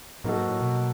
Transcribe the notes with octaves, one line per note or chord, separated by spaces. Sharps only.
A2 F#3 A#3 D#4 F#4 A4
G#2
A2
B2